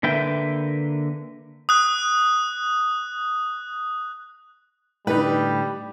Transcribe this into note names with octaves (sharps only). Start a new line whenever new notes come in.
D3 A#3 B4 E5 G5
D#6 F#6
A2 D3 G3 D#4 B4